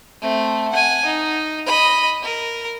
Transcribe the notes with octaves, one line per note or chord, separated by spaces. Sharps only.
A3 C4
F#5 G#5
D#4
D#5 B5
A#4